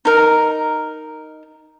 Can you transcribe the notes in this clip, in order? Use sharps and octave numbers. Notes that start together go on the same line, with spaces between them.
D#4 A#4